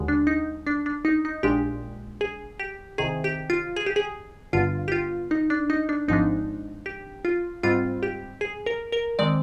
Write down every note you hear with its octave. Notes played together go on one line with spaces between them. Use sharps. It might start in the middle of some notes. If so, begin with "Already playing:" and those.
Already playing: D#2 D3 G#3
D4
D#4
D4
D4
D#4
D#4
A#1 A#2 G#3 D4 G4
G#4
G4
C2 C3 D#3 G#4
G4
F4
G#4
G4
G#4
G1 G2 D3 F4
G4
F4
D#4
D4
D#4
D4
G#1 G#2 F3 G#3 D4 D#4
G4
F4
G#2 G3 C4 F4
G4
G#4
A#4
A#4
D#3 G#3 C4 D5